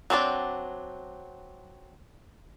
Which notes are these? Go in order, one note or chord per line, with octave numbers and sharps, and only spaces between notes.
F#3 C4 D4 D5